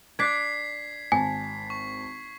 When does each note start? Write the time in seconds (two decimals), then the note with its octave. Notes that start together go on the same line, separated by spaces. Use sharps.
0.19 D4 D5 G#6 B6 C7
1.12 G#1 G#5 A5
1.70 C#6